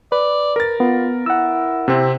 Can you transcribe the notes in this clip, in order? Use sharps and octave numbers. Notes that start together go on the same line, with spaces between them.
B4 D5
A#4 A6
B3 F4
E4 F#5 E6
C3 C4